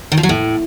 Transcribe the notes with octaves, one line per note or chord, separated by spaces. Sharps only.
D#3
F3
F#3
A2